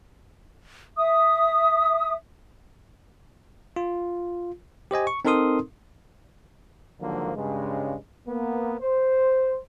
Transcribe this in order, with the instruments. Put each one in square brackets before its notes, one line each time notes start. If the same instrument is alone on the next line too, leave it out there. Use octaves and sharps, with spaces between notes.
[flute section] E5 D#6
[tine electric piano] F4
G4 C5 D#5 G#5
C#6
C4 D#4 A4 A#4 C6 D#6
[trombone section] G#2 D3 D#3 F3 F#3 A#3
G2 C#3 G#3
A#3 B3
C5